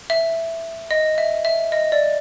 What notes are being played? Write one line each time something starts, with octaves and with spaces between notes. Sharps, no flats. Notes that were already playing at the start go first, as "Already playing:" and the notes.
E5
D#5
E5
E5
D#5
D5